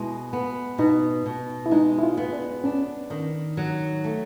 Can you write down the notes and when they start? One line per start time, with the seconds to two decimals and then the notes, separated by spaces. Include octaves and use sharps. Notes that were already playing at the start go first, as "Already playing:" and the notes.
Already playing: B2 G#3 E4
0.33 B3
0.78 B2 D#4
1.26 B2
1.66 E4
1.71 G#3 D#4
1.98 E4
2.03 F4
2.17 B3
2.33 D4
2.64 C#4 D4
3.10 D#3
3.57 F#3
4.04 A3